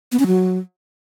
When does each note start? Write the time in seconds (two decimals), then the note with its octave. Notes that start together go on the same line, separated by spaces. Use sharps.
0.12 B3
0.19 C#4
0.27 F#3